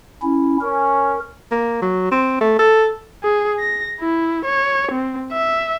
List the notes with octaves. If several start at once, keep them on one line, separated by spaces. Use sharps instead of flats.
C#4 E4
C#4 A#4
A#3
F#3
C4
A3
A4
G#4
A#6
E4
C#5
C4
E5